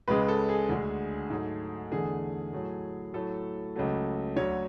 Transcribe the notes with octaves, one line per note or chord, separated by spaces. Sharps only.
C#2 C#3 G#3 B4
A4
G#4
D2 D3 G#3
G#2 F#3 A3
E2 D3 A3 G#4
A2 F#3 A3
A2 F#3 A3 A4
C#2 C#3 F#3 A3
D2 D3 F#3 C#5